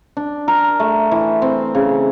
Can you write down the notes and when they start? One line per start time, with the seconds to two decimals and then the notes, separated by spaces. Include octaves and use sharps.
0.17 D4
0.48 A#4
0.80 A3
1.12 E3
1.42 C4
1.75 C#3